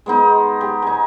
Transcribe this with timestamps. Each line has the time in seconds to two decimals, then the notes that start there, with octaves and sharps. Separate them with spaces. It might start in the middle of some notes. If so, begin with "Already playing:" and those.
0.06 G#3 B3 D#4
0.61 G4
0.82 D#4 G#5